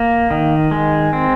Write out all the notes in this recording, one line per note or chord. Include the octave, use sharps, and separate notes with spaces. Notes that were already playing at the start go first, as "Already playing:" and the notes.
Already playing: A#3
D#3
G#3
C4